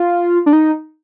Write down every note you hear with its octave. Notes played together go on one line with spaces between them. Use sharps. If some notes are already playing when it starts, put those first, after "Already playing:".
Already playing: F4
D4
D#4